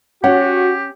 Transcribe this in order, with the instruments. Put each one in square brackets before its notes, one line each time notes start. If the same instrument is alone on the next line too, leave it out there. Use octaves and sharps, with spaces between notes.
[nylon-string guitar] C#4 [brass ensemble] F#4 [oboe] G4 [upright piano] F#5